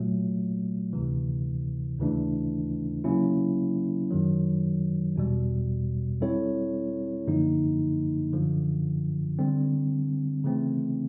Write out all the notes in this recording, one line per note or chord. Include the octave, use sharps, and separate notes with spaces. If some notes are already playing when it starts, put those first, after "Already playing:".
Already playing: A#2 F#3 A3
D2 C3 E3
D#2 C#3 E3 A3 D4
C#3 F#3 A#3 C#4 E4
F#2 D#3 F#3
E2 B2 G3
G3 C4 E4 A4 C#5
F#2 D3 F3 A#3 D#4
F#2 D3 F3
D3 G3 C4
C#3 E3 A3 C4